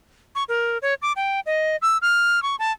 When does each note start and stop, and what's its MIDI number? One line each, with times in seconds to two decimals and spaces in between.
0.35 0.44 85
0.49 0.78 70
0.82 0.94 73
1.02 1.12 86
1.16 1.40 79
1.46 1.76 75
1.82 1.98 88
2.02 2.43 89
2.43 2.56 85
2.59 2.72 81